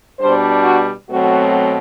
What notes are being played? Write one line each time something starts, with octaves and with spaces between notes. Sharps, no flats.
B2 G3 D4 C5
F#4
B2 F#3 A3 C4 F#4